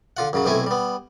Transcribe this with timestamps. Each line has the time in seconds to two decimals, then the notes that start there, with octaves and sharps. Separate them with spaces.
0.17 D3 F4 F#5
0.33 F#2 C#3 F#3
0.45 B1 C3 A3 E4 G#5
0.66 G3 B3